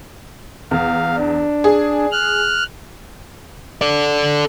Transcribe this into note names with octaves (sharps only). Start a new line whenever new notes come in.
E2 F5
D4
G#4
F6 F#6
A4 D5